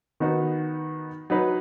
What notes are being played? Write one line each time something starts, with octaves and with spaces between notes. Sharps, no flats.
D#3 B3 D#4 F#4 B4
F#3 D#4 B4